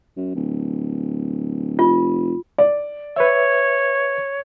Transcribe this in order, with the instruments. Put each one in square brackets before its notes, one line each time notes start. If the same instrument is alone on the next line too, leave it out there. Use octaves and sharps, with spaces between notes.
[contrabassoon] F#2
D1
[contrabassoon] F1 [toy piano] F4
[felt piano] D5
[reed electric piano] B4 E5 [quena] C#5